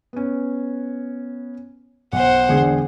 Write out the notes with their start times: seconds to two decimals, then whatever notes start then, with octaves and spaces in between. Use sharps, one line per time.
0.13 B3 C#4
2.13 B1 C5 F#5
2.49 E1 D3 G#4